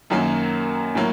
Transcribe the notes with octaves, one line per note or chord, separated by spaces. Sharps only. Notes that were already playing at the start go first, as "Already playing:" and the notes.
F#2 D#3 F#3 A#3
A2 F#3 A#3